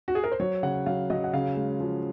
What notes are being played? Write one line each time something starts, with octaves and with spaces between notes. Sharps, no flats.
F#4
G#4
A#4
C5
F#3 C#5
C#3 F#5
F#3 F5
F#3 D#5
F#5
C#3 F5
G#3
F3